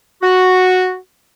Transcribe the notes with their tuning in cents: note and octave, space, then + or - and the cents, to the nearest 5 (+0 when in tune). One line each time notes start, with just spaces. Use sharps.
F#4 -5